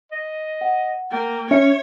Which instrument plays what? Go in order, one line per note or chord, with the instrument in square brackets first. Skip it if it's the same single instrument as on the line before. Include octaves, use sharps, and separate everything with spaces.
[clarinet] D#5
[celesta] F#5
[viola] A#3 [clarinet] G5
[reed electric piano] C#4 [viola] C#5 [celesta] E5 C#7